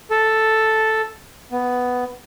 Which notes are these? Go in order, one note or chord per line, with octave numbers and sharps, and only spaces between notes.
A4
B3